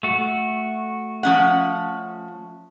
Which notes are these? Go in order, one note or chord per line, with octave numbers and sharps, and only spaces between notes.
A3 F#4
F3 C#4 F#5